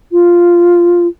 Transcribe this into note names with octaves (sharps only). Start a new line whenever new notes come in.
F4